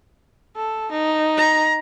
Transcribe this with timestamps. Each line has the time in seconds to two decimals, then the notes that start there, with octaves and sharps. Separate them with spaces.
0.56 A4
0.92 D#4
1.38 A#5